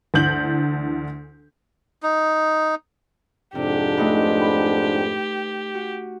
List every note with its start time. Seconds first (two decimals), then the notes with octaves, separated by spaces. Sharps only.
0.14 D2 E3 D4 G6 F#7
2.03 D#4
3.55 F2 G#2 C3 D4 G4
3.97 A3 D#4 B4
4.41 B5
5.75 F#4